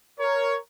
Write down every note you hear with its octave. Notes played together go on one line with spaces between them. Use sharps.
A#4 C#5